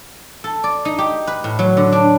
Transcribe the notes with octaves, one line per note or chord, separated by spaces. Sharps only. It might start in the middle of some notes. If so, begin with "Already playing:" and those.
A4
D5
D#4
G4
B4
A2
F#3
D3
D4